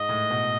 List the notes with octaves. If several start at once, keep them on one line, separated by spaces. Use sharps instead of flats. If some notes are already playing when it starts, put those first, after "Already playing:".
Already playing: G#2 D#5
A2
B2